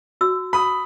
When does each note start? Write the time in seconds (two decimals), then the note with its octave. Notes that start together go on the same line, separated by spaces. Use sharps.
0.21 F#4 E6
0.53 B5 D#6